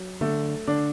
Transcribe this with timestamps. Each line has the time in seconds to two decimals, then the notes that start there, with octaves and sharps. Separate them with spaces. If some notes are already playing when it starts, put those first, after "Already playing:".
Already playing: F#3
0.21 D3 A3
0.68 D3 D4